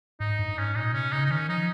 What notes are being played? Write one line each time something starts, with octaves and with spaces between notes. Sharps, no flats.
G#2 D#4
G2
G#2 C#4
A#2 D#4
C3 C#4
C#3 D#4
D#4
D#3 C#4
F3 D#4